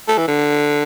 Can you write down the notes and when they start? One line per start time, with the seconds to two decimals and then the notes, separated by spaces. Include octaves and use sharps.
0.08 A3
0.18 E3
0.28 D3